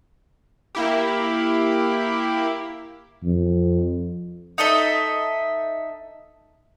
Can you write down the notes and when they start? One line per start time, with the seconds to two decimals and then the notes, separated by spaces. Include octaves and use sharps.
0.75 A#3 E4 G4
3.23 F2
4.58 D#4 A4 D#5 E5